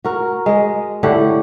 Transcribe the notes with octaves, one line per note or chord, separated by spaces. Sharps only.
F#4 A#4
G#3 D#5
A2 D3 G4 F#5